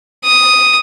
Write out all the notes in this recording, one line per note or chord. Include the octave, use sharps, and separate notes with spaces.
D#6